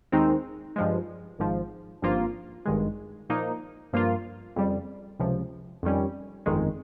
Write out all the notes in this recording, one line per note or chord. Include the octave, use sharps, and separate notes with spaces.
D#2 D#3 G#3 C4 D#4
G2 F3 G#3
G#1 G#2 F3
G#1 G2 F3 A#3 F4
G#1 G2 D#3 G#3
A#2 F3 A#3 D#4
G2 F3 A#3 F4
F2 C#3 G3
C#2 C3 F3
F2 D#3 G3 C#4
G1 F2 D#3 G#3